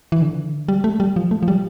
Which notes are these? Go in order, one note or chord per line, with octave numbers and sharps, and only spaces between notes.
E3
D3
G3
A3
G3
F3
A3
F3
G3